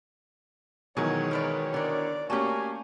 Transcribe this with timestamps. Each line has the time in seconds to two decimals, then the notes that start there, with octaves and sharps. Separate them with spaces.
0.97 B2 D#3 E3 F#3 G#3 G#4 C#5
1.31 A#4 B4 D5
1.74 D3 A#4 D5
2.30 A3 A#3 C#4 F#4 G4 G#5